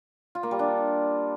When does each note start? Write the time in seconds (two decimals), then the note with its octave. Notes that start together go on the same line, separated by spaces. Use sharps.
0.35 F4
0.43 A#3
0.51 G3
0.59 D4